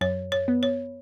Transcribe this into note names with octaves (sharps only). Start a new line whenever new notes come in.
F#2 C#5
C#5
B3
C#5